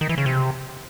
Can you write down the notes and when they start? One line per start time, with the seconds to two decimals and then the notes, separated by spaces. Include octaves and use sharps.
0.01 D#3
0.09 E3
0.18 C#3
0.26 C3